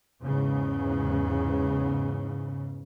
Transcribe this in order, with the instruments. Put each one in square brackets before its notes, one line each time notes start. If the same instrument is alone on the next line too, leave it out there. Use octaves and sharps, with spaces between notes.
[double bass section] E2 G#2 C#3